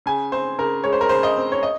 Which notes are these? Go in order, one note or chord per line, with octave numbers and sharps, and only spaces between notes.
C#3 G#5
C4 C5
C#3 A#4
G#3 C#5
C5
A#4
C#3 C5
D#5
C4
C#5
D#5